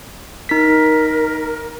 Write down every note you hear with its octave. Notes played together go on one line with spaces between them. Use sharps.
D#4 A#4 B6